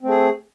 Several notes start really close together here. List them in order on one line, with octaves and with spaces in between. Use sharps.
C4 A3 G#4